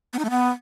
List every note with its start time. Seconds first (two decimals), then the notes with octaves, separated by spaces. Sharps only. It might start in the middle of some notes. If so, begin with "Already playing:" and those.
0.13 B3
0.19 D#4
0.25 A3
0.30 B3